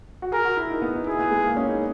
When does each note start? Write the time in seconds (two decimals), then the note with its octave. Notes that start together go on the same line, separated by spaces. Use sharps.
0.22 F#4
0.32 G#4 A#4
0.45 F#4
0.57 E4
0.70 D#4
0.82 B3
0.95 D#4
1.07 E4 G#4
1.19 B3
1.31 G#3
1.44 A#3
1.57 C#4
1.69 D#4